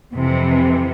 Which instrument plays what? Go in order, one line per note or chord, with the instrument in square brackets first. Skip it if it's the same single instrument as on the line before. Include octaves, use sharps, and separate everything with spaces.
[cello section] F2 C3 E3